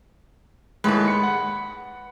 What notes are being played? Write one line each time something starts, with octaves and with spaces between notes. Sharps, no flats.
D#2 A2 G#3 B4 B5
C#7
F#5